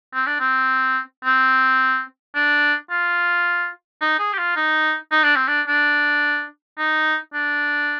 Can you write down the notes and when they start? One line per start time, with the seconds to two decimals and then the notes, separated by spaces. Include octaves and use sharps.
0.13 C4
0.26 D4
0.40 C4
1.24 C4
2.35 D4
2.90 F4
4.01 D#4
4.19 G#4
4.33 G4
4.38 F4
4.56 D#4
5.12 D#4
5.23 D4
5.36 C4
5.48 D4
5.68 D4
6.78 D#4
7.33 D4